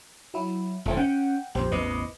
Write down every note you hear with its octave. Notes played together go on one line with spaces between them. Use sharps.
F#3 E4
F1 D2 F3 A3 C4
C#4 F#5 G5
A#1 F2 G4 C5
A1 E2 C3 B4 D#5 D6